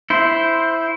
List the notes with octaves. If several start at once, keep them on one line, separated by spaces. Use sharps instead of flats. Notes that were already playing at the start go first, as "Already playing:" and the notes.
E4 C5